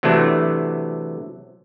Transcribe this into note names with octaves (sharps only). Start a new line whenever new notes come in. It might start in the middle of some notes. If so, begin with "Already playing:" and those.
C3 E3 F#3 A3 D4